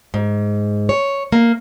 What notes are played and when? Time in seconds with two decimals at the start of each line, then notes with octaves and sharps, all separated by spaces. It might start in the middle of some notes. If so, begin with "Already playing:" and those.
0.14 G#2
0.89 C#5
1.32 A#3